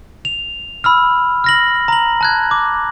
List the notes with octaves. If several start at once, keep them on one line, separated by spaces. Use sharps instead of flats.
F7
B5 E6 F6
F6 A#6 F#7
A#5 F#7
A5 F#6 G#6
D6